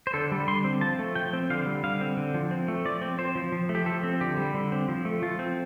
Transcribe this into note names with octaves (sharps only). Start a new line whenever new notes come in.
C5
D3 A4
G3
D3 C6
C4
F3 A5
A3
F3 G5
C4
D3 F5
G3
D3 F5
C4
D3
F3
C4
A3
F3 D5
C4
C4 C5
F3
F3
A3
G4
F3 A4
C4
D3 G4
G3
D3
C4
F3
A3
F3 F4
C4